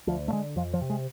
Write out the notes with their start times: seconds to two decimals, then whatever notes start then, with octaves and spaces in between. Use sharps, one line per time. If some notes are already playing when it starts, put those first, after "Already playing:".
0.07 D2 F3
0.28 A3
0.32 D3 G#3
0.56 F2 F3
0.74 F3
0.81 C3
0.90 G#3